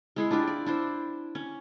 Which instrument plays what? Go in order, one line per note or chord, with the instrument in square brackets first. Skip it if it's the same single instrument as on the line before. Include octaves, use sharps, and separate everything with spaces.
[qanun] G#3 E4 G#4
D4 E4 F4 G4
D5
D4 E4 C5
C#4